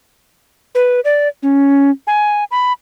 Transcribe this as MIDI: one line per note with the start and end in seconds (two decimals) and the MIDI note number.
0.75 1.00 71
1.05 1.28 74
1.43 1.91 61
2.07 2.44 80
2.51 2.73 83